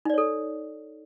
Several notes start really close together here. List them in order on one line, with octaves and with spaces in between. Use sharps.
D#4 D5 C#5 A4